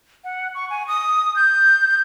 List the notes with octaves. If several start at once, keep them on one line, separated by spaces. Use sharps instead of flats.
F#5
C#6
G#5
D#6
G6